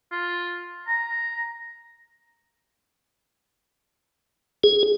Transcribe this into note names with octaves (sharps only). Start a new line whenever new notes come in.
F4
A#5
G#4